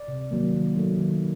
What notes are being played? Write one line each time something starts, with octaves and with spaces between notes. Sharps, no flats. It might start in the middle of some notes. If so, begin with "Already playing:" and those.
Already playing: D5
C3
D#3 F#3 A#3
D#3
F#3 A3
D#3